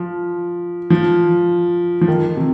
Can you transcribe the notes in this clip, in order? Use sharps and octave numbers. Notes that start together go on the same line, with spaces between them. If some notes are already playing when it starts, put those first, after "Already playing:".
Already playing: F3
F3
F3
D#3
C3